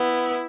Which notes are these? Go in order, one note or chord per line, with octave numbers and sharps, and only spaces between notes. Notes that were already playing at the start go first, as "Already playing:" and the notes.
Already playing: B3 E4